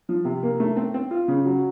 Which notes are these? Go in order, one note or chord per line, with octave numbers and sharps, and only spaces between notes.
F3
C3
A#3
A3
C4
C4
F4
C#3
F#3